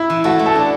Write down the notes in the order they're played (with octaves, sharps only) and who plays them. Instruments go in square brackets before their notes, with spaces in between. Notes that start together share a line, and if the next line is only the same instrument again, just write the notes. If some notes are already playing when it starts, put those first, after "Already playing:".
Already playing: [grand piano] E4
[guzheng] E3
[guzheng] A3 [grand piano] F#4
[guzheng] A3
[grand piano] A4
[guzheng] D4